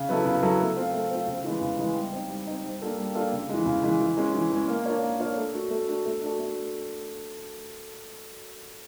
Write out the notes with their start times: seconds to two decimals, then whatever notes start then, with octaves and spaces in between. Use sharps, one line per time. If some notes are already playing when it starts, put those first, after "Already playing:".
Already playing: C#3
0.09 F#3 B3 E4 A4
0.25 C#3
0.42 F#3 B3 E4 A4
0.59 A3
0.76 C4 F4
0.94 A3
1.11 C4 F4
1.27 C#3
1.44 E3 G#3 B3
1.61 C#3
1.78 E3 G#3 B3
1.95 G3
2.13 C4 D#4
2.29 G3
2.47 C4 D#4
2.64 G3
2.82 A#3 D4 F4 A4
2.98 G3
3.15 A#3 D4 F4 A4
3.32 C#3
3.49 E3 G#3
3.66 C#3
3.83 E3 G#3
4.00 E3
4.17 G#3 C#4
4.34 E3
4.52 G#3 C#4
4.68 A#3
4.86 D4 F4 A#4 C#5
5.03 A#3
5.19 D4 F4 A#4 C#5
5.36 A3
5.53 D4 F#4
5.70 A3
5.88 D4 F#4
6.05 A3
6.22 D4 F#4 A4
6.39 A3